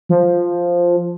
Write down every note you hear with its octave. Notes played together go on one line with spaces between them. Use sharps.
F3